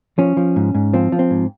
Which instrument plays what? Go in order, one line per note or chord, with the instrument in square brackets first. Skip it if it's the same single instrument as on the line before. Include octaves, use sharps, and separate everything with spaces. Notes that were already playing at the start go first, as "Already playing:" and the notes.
[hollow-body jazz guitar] F3 C#4
F3
G#2
G#2
F3 C4
F3
C4
G#2